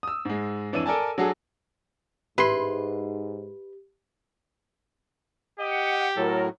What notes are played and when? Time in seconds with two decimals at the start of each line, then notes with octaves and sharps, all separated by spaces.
0.03 D#6 E6
0.25 G#2 G#3
0.72 F2 E3 D4 C#5 E6 D#7
0.86 A4 A#4 D5 G#5 A5
1.18 F#3 D4 F#4 G#4 A4
2.38 A1 G#2 E4 G4 B4 C6
5.60 G4 D#5 F#5
6.17 A2 F#3 A4 A#4